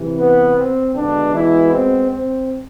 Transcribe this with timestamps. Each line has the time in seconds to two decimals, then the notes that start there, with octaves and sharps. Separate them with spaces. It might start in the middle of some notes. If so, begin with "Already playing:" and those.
Already playing: C3 E3
0.18 B3 B4
0.57 C4
0.95 B2 D3 G#3 B3 D4
1.33 E3 E4
1.72 C4
2.10 C4